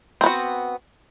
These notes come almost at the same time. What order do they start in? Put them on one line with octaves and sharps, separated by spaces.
C4 B3 F#4